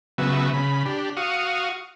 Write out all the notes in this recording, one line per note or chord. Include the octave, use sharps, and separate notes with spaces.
C#3 F#3 B3 E5
C#3 B5
D4 G4
F#4 F5 C#6 D#6